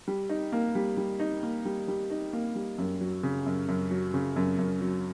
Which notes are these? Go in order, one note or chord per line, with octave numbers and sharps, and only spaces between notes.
G3
D#4
A#3
G3
G3
D#4
A#3
G3
G3
D#4
A#3
G3
F#2
F#3
C#3
F#2
F#2
F#3
C#3
F#2
F#2
F#3